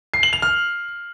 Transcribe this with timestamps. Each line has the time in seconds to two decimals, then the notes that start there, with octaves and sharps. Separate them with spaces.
0.14 C7
0.23 F#7
0.33 F7
0.42 F6